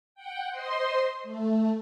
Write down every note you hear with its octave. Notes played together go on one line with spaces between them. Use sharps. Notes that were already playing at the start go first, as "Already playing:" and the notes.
F#5 G5
C5 D#5 C6
A3